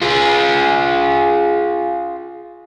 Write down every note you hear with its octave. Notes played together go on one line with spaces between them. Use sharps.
F4 G#4